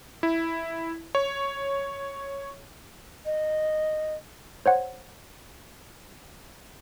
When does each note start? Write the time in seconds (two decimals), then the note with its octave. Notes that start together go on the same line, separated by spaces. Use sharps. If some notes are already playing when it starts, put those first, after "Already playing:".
0.23 E4
1.15 C#5
3.25 D#5
4.66 C5 C#5 F#5